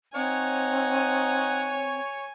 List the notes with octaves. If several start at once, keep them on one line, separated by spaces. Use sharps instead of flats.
C4 D#4 C#5 F#5 G#5